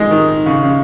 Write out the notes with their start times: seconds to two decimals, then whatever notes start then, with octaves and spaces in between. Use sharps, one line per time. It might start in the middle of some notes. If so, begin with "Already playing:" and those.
Already playing: D#3 G#3
0.11 D#3
0.46 C#3
0.63 C#3